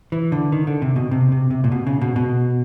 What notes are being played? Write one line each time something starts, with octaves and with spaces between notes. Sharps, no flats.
E3
D3
D#3
D3
C3
B2
C3
C3
C3
A#2
B2
C#3
B2
B2